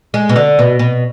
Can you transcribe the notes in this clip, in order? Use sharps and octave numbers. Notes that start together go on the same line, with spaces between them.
G#3
B2
D3
B2
B2